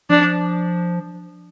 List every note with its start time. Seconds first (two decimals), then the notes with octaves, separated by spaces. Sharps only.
0.10 F3 D4